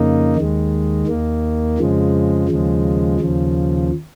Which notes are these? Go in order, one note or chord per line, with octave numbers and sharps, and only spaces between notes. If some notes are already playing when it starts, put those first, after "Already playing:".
Already playing: F2 C#3 A#3 D#4
D#2 D#3 G#3
D#2 D#3 A#3
F2 C#3 F3 G#3
D#2 C#3 F3 G#3
D#2 C#3 F3